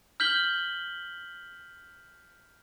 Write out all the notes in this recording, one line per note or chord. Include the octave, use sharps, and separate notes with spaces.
F6 G6 B6 F#7 G7